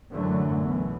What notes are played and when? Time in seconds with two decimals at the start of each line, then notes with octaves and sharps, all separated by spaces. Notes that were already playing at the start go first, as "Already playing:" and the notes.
0.12 F#2 A2 D3 E3 F#3 A3
0.57 B1 B2 E3